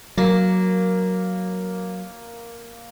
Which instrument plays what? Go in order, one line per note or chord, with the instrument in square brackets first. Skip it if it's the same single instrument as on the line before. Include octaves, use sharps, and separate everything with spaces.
[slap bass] F#3 [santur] A#3